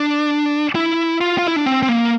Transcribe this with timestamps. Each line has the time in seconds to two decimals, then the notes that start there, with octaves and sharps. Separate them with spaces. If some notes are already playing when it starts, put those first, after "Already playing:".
Already playing: D4
0.75 E4
1.21 F4
1.38 F4
1.48 E4
1.56 D4
1.66 C4
1.83 C4
1.89 A#3